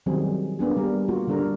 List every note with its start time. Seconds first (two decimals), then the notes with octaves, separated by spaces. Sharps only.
0.06 D#3 F#3 G3 C4 G#4
0.59 A#3 B3 D4 G#4
0.77 G3 A#4
1.08 A#3 F4 F#4
1.27 D3 G3 D4 A4 A#4